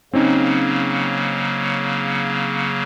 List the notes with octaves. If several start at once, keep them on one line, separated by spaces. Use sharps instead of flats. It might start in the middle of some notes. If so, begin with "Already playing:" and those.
C#3 F#3 A#3 C4 C#4 D#4